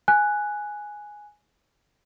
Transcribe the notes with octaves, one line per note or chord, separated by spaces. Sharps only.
G#5 F#6